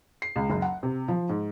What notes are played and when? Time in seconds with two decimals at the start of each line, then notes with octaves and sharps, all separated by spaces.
0.22 C7
0.36 C#2
0.50 F#1
0.62 F#5
0.83 C3
1.08 F3
1.29 G#2